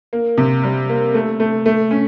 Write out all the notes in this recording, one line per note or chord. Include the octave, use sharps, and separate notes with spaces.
A#3
C3
G3
A#3
A3
A3
A3
C#4